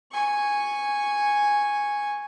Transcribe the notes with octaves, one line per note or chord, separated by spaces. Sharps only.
G#5 C#6